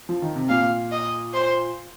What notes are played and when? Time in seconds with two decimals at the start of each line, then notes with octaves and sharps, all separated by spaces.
0.09 F3
0.22 D#3
0.36 C3
0.50 A#2 F5
0.92 D#5
1.34 C5